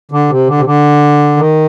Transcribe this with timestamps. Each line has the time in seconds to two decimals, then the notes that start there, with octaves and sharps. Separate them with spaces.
0.11 D3
0.29 C3
0.47 D3
0.58 C3
0.65 D3
1.37 D#3